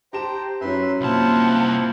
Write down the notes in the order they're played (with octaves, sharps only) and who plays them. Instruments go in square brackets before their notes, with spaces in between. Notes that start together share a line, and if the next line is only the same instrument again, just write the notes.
[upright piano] G4 A5 E7 [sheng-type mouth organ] C5 G5 A#5
[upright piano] F#2 F#3 [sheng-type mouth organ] B4 E5 C6
[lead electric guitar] C2 A5 [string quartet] A#3 C4 F#5 [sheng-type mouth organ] E4 F4 C5